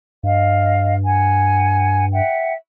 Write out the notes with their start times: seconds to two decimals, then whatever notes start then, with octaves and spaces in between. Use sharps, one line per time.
0.23 G2 D#5 F5
1.04 F#5 G#5
2.12 E5 F#5 G5